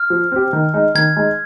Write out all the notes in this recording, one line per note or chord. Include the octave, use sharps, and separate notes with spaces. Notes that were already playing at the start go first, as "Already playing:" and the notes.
Already playing: F6
F3
C4 G4
D#3
G#3 D#4
D#3 G#6
G#3 D#4